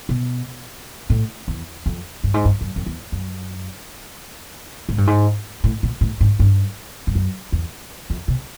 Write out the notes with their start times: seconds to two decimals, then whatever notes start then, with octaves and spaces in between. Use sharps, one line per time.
0.09 B2
1.10 A2
1.48 E2
1.86 F2
2.24 G2
2.34 G#2
2.45 G2
2.61 F#2
2.76 F2
2.86 E2
3.12 F#2
4.89 G#2
4.98 G2
5.07 G#2
5.64 A2
5.83 A#2
6.01 A2
6.21 G#2
6.40 G2
7.07 G2
7.15 F#2
7.52 E2
8.10 F2
8.28 B2